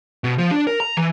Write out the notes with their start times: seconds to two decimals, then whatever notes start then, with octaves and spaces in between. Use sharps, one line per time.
0.24 B2
0.38 F3
0.51 D4
0.67 A#4
0.80 A#5
0.97 E3